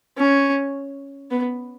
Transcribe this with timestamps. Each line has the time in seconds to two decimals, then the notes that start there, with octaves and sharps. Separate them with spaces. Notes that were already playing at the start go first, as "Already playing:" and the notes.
0.18 C#4
1.30 B3